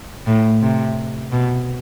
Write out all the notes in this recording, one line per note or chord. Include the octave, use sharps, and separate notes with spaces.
A2
C3
B2